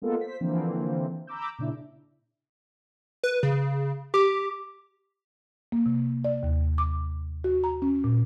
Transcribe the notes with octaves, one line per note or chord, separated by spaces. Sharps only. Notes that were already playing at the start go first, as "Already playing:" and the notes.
G#3 A#3 B3 F4 A4 A#4
C5 B6
D3 E3 F3 A#3 C4
A#5 B5 D6 E6 G6
A#2 C#3 D4 E4
B4
C#3
G4 D6
A#3
C3
D5
D#2
D6
F#4
A#5
C#4
A#2